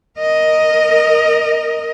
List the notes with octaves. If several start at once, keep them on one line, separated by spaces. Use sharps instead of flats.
A#4 D#5